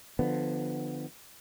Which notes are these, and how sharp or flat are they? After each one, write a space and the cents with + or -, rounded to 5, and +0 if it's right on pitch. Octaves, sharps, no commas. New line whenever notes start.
D3 +25 F3 +0 B3 +10